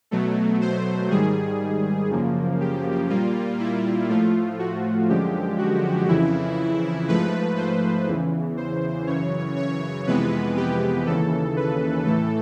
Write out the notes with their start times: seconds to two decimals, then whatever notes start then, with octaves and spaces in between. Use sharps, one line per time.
0.11 B2 F#3 A3
0.61 C5
1.10 G#2 D#3 G3 G#4
2.10 F#2 C#3 F3 A#3
2.60 G4
3.09 A#2 G3 A#3 F4
3.59 E4
4.09 A2 F3 A3 F4
4.59 F#4
5.08 F#2 D3 F3 G#3 G4
5.58 F#4
6.08 F2 C#3 E3 E4
7.08 G#2 F3 A3 B4
7.57 C5
8.07 E2 C#3 E3
8.57 C5
9.07 F#2 C#3 E3 C#5
9.56 C#5
10.07 F2 C3 E3 G#3 B3 B4
10.57 G4
11.06 D#2 C#3 E3 A4
11.56 B4
12.06 A2 E3 A3 A4